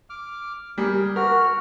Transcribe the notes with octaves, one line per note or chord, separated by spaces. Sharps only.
D6 F6
G3 G#4 A#4
F#4 A#4 F6